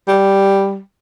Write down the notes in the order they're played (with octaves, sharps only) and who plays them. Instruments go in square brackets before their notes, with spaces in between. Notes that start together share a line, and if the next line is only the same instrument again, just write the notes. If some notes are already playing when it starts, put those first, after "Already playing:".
[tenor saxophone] G3